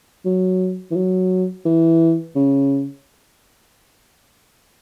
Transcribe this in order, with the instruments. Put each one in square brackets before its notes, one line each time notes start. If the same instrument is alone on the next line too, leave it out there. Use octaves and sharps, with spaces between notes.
[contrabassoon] F#3
E3
F#3
E3
C#3